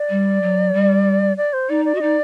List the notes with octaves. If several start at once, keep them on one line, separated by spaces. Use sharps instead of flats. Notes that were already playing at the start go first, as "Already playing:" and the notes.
Already playing: D5
G3
F#3
G3
D5
C5
D#4 D5
D5
F#4
D#5
D#4 D5